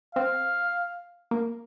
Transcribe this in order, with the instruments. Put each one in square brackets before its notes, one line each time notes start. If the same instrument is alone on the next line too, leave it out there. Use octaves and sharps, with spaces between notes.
[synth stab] C4 [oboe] F5
[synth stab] A#3